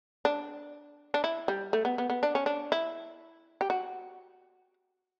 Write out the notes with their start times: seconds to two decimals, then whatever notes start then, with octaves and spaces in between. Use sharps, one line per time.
0.25 D4
1.14 D4
1.24 E4
1.48 G3
1.73 A3
1.85 B3
1.98 B3
2.10 B3
2.23 D4
2.35 C#4
2.46 D4
2.72 E4
3.61 G4
3.70 F#4